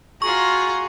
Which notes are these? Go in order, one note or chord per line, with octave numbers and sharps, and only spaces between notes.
F4 F#4 G#4 A#5 C#6